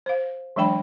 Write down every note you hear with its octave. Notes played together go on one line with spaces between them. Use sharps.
C5 F5
E3 F#3 G#3 D4 G5 B5